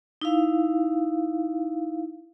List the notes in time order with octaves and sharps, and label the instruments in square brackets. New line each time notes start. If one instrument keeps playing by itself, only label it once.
[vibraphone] D#4 E4 F5